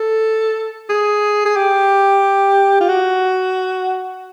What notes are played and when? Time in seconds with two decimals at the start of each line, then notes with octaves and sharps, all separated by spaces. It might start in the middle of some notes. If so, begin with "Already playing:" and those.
Already playing: A4
0.90 G#4
1.46 G#4
1.56 G4
2.81 F4
2.89 F#4